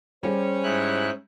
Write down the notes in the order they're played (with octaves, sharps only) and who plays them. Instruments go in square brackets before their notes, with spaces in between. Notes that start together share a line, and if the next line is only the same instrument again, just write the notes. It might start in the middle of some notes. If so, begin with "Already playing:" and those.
[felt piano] G3 G4 G#4 [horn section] C#4 [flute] C5
[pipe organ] G#2 E4 F#6